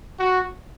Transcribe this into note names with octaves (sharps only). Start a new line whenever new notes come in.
F#4